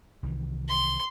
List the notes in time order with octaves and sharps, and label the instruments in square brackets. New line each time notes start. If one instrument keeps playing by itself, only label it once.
[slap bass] C2 D#3 E3
[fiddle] C6